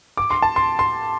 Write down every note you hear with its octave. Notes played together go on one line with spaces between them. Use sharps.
D6
C6
A5
C6
C6